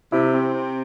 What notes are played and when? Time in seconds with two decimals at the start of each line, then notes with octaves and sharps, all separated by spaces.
0.12 C3 E4
0.33 C4
0.53 C3